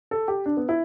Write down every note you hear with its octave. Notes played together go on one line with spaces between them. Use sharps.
A4
G4
D4
B3
E4